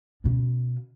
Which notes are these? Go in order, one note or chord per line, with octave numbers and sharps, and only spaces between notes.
B2 C#4